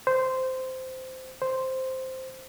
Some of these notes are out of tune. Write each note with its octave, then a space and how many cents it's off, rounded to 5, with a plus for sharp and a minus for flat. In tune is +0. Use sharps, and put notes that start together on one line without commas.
C5 -10
C5 +0